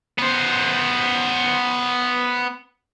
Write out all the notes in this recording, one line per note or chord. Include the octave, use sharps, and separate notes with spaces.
B3 C5